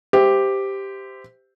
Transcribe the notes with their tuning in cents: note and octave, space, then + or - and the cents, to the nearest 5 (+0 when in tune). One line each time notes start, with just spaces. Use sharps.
G4 +0 C5 -20 E5 +0